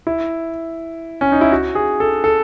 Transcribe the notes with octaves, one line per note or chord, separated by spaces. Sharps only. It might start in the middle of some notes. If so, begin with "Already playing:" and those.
E4
C#4
D#4
E4
F#4
G#4
A4
A4